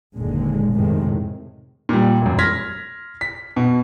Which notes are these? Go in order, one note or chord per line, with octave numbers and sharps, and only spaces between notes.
F#1 D#2 A#2 D3 G#3
F2 A2 C3 D#3 G#3
A#2 G3
E1 F#2
C6 F6 G#6 A#6 B6
B6
B2